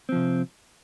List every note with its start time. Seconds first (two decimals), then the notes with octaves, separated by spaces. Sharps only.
0.09 C4
0.12 F3
0.15 C3